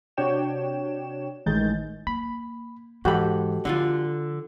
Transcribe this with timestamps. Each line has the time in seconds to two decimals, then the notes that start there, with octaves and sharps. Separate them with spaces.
0.17 C3 D4 F#4 C#5 G5 E7
1.46 A1 D#3 G#3 G6 A6
2.07 A#3 B5
3.05 G#2 E3 F#4 G4 A4 B5
3.65 D3 F3 D4 F4